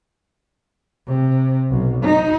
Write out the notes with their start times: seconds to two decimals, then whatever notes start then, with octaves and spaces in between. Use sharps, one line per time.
1.07 C3
1.70 B1
2.03 D#4